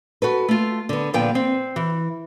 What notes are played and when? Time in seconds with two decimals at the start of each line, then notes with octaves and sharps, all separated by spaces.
0.22 F#4 A4 B4
0.49 A3 F4
0.89 D3 B3
1.14 A#2 D3 F3 B3 G5
1.35 C4
1.76 E3